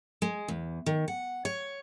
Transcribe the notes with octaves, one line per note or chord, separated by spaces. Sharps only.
G#3
E2
D#3
F#5
C#5